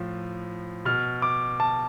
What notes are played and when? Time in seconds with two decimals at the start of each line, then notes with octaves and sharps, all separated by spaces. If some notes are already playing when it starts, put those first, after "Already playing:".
Already playing: A2 F3
0.85 B2 F6
1.22 D6
1.60 A5